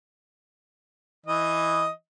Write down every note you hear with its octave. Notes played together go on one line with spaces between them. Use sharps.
E3 D#5